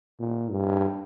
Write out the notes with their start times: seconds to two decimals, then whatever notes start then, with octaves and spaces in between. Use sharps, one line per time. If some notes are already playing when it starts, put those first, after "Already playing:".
0.20 A#2
0.51 G2